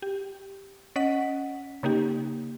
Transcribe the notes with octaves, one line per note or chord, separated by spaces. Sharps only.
G4
C#4 D#5 F#5 B6
C#3 A#3 D#4 G4